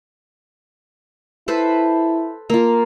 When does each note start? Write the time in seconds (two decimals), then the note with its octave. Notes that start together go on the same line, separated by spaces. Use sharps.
1.48 E4 A4 B4 C5
2.50 A#3 F4